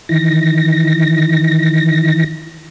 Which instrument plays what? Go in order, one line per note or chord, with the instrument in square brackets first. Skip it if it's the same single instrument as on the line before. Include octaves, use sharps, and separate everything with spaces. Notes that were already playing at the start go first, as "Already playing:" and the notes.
[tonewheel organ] D#3 E3 A#6